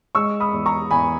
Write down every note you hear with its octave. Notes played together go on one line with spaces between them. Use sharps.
G#3 C#6 E6
B5 D#6
E2
A#5 C#6
E2 G#5 B5